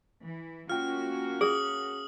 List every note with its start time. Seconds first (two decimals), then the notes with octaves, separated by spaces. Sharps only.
0.24 E3
0.70 A#3 C#4 F4 F#4 G5 F6
1.41 G#4 D#6 F#7